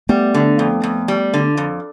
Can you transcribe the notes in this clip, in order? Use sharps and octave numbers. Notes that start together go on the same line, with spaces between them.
G3 A3 B3
D3
F2
F2
G3
D3
F2